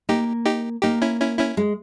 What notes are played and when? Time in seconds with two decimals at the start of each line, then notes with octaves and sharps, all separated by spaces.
0.09 A#3 D#4 G4
0.46 D#4 G4
0.83 A#3 D#4 G4
1.02 C#4 E4
1.20 C#4 E4
1.39 C#4 E4
1.57 G#3